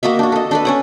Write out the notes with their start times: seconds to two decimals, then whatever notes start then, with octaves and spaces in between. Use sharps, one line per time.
0.03 A#3 F#4 D#5 E5
0.19 D4 F#4
0.32 A4 D#5
0.51 D4 A4 B4
0.65 C#4 C#5 F#5